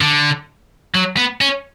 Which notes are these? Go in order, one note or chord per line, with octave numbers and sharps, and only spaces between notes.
D3
F#3
B3
C#4